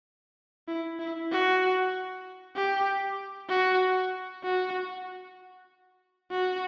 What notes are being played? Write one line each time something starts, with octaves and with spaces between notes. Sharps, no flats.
E4
E4
F#4
G4
F#4
F#4
F#4